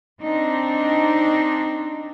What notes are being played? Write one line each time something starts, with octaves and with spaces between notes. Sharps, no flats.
C4 D4 D#4